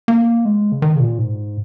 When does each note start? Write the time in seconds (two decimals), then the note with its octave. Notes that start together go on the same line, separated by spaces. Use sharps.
0.08 A#3
0.45 G#3
0.72 C#3
0.82 D#3
0.96 C#3
1.00 A#2
1.19 G#2